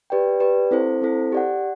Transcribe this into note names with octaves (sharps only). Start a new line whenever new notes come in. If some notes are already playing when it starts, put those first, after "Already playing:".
G4 B4 D5 G5
G4 B4 D5 G5
C4 E4 A4 C5
C4 E4 A4 C5
G4 D5 F#5